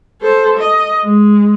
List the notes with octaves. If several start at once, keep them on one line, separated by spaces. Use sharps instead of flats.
A4 C5
D#5
G#3